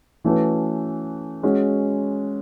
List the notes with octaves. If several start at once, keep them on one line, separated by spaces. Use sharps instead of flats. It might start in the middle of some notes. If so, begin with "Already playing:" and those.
E3 A3 C#4 F#4 B4
G#3 C#4 F#4